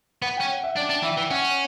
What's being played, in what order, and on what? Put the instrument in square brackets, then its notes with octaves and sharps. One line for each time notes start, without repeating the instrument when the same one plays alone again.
[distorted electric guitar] B3 [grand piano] F#5
[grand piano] G5
[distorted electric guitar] C#4
[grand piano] F#5
E5
[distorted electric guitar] D4 [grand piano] D5
[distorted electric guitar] D4
[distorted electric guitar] E3 [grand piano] E5
[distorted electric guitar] E3
[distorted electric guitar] C#4 [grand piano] F#5